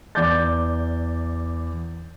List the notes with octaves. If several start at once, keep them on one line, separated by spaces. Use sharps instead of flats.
E2 D5 D6 G6 A6